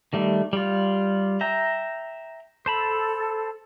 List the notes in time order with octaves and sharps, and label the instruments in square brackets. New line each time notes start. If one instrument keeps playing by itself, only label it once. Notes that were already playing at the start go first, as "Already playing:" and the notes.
[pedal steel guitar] D#3 G3 A3
G3 F4
E5 G5 A#5
[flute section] A4 [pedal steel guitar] C5 A5 B5